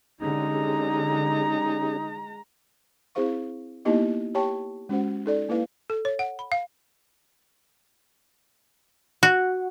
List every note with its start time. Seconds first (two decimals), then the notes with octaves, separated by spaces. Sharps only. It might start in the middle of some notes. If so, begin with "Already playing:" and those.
0.21 D3 G#3 C#4 D#4 G4 G#4 A#5
3.15 C4 E4 G#4 C5 F5 C#6
3.85 A#3 B3 D#4 E4 G4 D#5
4.35 G4 C#5 G5 A5 C#6
4.89 G#3 C#4 F#4 C5 F#5
5.26 D#4 A4 D5
5.49 A#3 E4 B4 F5
5.90 A4
6.05 C#5
6.19 F#5
6.39 B5
6.52 F5
9.23 F#4